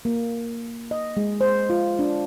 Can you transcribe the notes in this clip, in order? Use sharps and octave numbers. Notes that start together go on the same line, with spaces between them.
A#3
D#5
G#3
C5
F4
D4